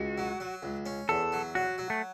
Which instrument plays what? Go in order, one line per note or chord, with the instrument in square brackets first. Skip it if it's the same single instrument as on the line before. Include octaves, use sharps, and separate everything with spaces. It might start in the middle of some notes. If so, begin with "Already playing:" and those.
Already playing: [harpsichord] C#2 [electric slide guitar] F#4
[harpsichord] F#3
F#3
C#2
C#4
[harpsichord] E2 [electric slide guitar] A4
[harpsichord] F#3
[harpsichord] F#3 [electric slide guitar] F#4
[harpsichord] F#3
[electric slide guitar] A3